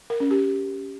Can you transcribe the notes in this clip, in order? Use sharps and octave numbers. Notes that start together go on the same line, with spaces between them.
A#4
C#4
G4